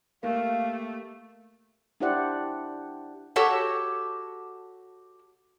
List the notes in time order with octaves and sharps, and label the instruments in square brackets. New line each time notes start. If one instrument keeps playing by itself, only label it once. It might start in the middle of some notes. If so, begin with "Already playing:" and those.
[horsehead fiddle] A3 G4 [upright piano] A#3 [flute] F5
[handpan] D4 E4 G4 C5 D5 F#5
[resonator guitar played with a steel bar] F#4 G4 A4 C#5 F#5